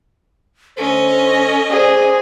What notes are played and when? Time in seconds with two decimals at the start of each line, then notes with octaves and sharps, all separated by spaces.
0.77 D2 C#4 A4 C5 D#5
1.70 G#4 C5 D5